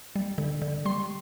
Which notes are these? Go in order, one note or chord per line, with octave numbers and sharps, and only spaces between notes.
G3
D3
D3
G3 C6